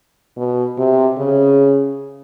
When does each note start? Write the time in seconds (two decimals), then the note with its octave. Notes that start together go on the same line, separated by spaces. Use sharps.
0.37 B2
0.77 C3
1.18 C#3